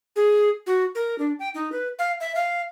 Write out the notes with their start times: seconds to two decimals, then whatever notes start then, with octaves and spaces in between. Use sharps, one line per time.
0.16 G#4
0.67 F#4
0.95 A#4
1.19 D4
1.39 G5
1.54 D#4
1.72 B4
1.99 F5
2.20 E5
2.35 F5